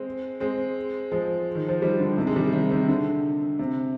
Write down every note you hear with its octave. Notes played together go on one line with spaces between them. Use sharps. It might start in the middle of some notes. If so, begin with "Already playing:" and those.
Already playing: G#3 C4
G#3 C4
F3 G#3
D#3
F3
D#3 G3
D3
C3 D#3
G#3
D#3 G3
C3 D#3
C3 D#3
D3
C3